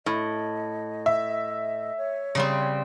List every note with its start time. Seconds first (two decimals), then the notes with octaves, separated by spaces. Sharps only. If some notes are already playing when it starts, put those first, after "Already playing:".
0.06 A2 D#5
1.06 E5
1.97 C#5
2.35 C#3 G3 C4